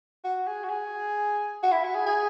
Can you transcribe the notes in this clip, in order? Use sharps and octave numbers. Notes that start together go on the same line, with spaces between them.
F#4
G#4
F#4
G#4
F#4
E4
F#4
G#4
G#4